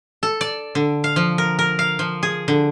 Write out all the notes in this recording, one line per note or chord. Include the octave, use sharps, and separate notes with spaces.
A4
D5
D3
F5
F3
A#4
A#4
F5
F3
G#4
D3